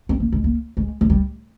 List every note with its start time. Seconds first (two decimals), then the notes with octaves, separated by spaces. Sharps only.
0.09 C4
0.20 A#3
0.32 G#3
0.44 A#3
0.77 G#3
1.01 G#3
1.10 G3